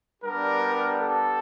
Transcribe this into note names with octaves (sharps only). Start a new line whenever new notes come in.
G3 B3 D4 G4 A#4
A4